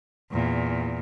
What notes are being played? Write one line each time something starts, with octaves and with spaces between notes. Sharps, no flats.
E2 A#2